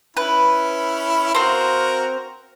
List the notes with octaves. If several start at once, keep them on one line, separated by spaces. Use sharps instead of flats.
C#4 E4 B4 B5
C4 F#4 A#4 C5 F5